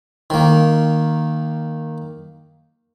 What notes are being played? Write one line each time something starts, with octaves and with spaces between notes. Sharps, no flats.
D#3 A#3